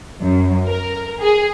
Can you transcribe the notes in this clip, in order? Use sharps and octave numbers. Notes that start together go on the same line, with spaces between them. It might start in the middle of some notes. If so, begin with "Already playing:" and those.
F#2
A#4
G#4